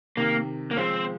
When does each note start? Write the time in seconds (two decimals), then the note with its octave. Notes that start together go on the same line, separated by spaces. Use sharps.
0.17 C3 D#3 A#3
0.71 A#3
0.77 F3 G#3 C4